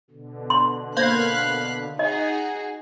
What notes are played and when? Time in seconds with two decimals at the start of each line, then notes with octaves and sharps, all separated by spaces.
0.11 B2 D3
0.50 C6
0.97 A#3 C5 F5 B5 F#6 G#6
1.99 D#4 F#4 G#4 D#5